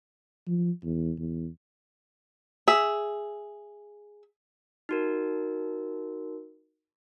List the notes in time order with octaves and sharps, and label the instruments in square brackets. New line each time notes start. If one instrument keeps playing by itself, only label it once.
[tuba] F3
E2
E2
[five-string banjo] G#4 E5
[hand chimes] D#4 F#4 A#4